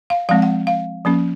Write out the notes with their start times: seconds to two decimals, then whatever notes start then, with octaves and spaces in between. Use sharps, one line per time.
0.10 F5
0.29 F3 G#3 C4 F5
0.42 F#5
0.67 F5
1.05 F3 A#3 C#4